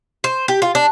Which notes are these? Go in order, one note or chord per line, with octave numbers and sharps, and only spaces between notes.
C5
G4
F4
D4